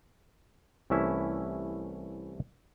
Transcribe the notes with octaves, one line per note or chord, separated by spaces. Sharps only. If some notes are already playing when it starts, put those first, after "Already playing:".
C2 E3 A3 C#4 E4 E5